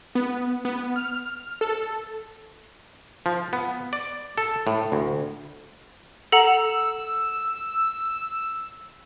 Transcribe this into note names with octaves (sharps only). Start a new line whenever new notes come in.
B3
B3
F6
A4
F3
B3
D5
A4
A2
D2
A4 F#5 A#5 E6